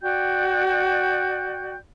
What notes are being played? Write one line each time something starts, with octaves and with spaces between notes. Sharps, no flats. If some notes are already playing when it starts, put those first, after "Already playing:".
F#4 D5 G5 G6